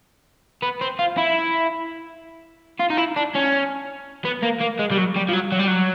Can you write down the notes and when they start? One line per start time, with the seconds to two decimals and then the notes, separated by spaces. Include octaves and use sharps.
0.63 B3
0.81 C4
0.99 F4
1.18 E4
2.80 F4
2.90 D#4
2.98 E4
3.16 D4
3.35 C#4
4.25 B3
4.43 A#3
4.61 A#3
4.79 G#3
4.91 G3
4.98 F#3
5.16 G3
5.29 F3
5.33 F#3
5.52 F#3
5.59 G3
5.68 F#3